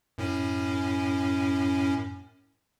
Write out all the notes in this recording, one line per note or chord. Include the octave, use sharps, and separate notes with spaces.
F#2 A2 C#4